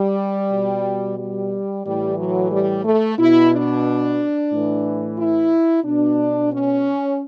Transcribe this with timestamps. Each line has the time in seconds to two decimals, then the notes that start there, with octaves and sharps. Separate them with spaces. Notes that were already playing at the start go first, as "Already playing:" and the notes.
Already playing: G3
0.52 B2
1.18 G3
1.85 A2 E3 G3
2.18 F#3
2.52 G3
2.85 A3
3.19 B2 E4
3.52 D4
4.51 A2 E3
5.19 E4
5.85 B2 D4
6.53 C#4